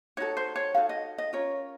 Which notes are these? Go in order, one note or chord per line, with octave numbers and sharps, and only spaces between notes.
D#4 F#4 A4 C#5
C5
C#5
D#4 F#4 A4 F5
D#5
D#5
C#4 F4 A#4 C#5